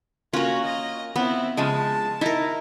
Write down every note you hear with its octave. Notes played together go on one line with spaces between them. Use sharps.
A#3 C#4 F4 F#4
D#5
B3 C4 E4
C#3 F3 G#3 A5
D#4 E4 A#4